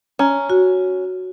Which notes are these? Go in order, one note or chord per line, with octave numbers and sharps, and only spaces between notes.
C#4 A#5
F#4